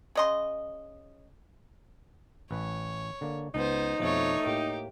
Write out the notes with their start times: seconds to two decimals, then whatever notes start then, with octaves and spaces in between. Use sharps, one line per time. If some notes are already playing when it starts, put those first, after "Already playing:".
0.15 C#3 D#5 C6
2.51 A1 B4 C#5
3.21 D3 A#3
3.55 C#2 B3 D#4 C5
4.00 F2 B2 F3 A3 C#5
4.46 A2 A#3 G4